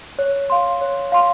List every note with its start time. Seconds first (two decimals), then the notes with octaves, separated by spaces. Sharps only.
0.19 C#5
0.50 F5 C6
0.81 C#5
1.12 F5 C6